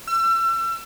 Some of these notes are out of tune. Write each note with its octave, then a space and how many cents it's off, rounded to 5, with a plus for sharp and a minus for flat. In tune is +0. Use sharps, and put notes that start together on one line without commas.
E6 +35